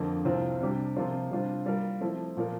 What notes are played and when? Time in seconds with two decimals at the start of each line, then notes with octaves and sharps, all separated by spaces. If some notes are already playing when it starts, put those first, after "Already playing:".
Already playing: F2 D3 F3 A#3
0.25 C2 C3 F3 C4 F4
0.61 C3 G3 D4 G4
0.96 C3 F3 A#3 F4 C5
1.31 C3 G3 D4 F4 C5
1.66 G3 A#3 F4 A#4
2.01 F3 A3 C4 E4
2.37 A#2 F3 A#3 F4 A#4